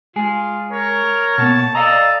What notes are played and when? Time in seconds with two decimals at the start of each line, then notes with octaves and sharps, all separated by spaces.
0.16 G#3 F4 G#4
0.72 A#4 C#5
1.38 B2 A#3 B3 A5
1.75 A4 D5 D#5 F5 A#5